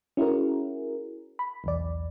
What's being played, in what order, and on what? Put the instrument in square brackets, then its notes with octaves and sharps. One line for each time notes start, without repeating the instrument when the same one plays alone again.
[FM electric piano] C#4 E4 F#4 G#4 A#4
B5
B1 E2 D5